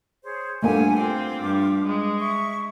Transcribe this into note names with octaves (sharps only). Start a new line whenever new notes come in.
G#4 C5 C#5
G2 A3 A#3 A4 F#5 G#5
C4 F4 D6
G2
G#3
E5 C#6